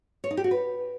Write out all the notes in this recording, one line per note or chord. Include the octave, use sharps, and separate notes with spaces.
C#5
D#4
G4
F#4
B4